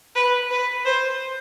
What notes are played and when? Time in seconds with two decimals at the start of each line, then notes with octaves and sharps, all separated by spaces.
0.16 B4
0.51 B4
0.85 C5